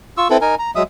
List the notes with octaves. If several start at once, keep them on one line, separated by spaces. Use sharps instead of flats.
F4 C#6 E6
C4 E4 A4 B4
D#4 A#4 G#5
A#5
F#3 G#3 E5 D#6